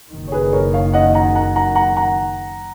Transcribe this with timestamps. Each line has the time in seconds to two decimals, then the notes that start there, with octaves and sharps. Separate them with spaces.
0.12 F#1 F#2 D#3
0.28 C#5
0.32 G#4 B4
0.53 A#4 C#5
0.74 C#5 F5
0.93 D#5 F#5
1.14 F#5 A#5
1.35 F#5 A#5
1.55 F#5 A#5
1.75 F#5 A#5
1.96 F#5 A#5